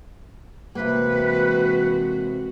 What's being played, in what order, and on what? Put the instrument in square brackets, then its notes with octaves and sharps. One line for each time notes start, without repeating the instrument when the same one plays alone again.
[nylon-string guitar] C3 A#3 [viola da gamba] E3 G#3 F#4 [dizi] B4